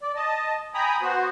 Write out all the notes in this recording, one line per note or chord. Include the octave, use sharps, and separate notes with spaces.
D5
D#5 A5
G5 G#5 A#5 B5 D#6
B3 F#4 C5